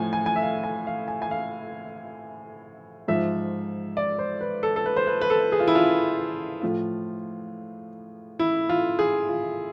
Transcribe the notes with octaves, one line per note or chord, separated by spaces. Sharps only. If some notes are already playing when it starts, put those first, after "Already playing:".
Already playing: A2 F3 G#5
G#5
G#5
E5
F5
G#5
F5
G#5
G#5
F5
G#2 F3 E5
D5
C5
B4
A4
A4
B4
C5
B4
B4
A4
G#4
F4
E4
F4
A2 F3 F4
E4
F4
G#4
F4